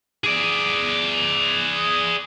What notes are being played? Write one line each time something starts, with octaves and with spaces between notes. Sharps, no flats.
G#4 D5